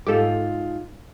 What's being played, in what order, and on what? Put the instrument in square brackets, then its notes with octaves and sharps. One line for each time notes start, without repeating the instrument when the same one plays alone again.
[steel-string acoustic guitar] G#2 F4 [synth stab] G4 A4